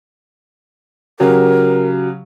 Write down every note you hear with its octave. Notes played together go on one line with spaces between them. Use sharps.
C#3 F#3 G4 A#4